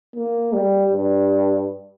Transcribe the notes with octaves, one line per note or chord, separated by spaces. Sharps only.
A#3
G3
G2